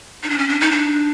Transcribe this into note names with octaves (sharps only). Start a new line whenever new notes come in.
D#4
D4
C#4
D4
D#4
D4